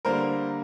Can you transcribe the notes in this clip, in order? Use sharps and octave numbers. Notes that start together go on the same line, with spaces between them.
D3 G3 A#3 A#4 C5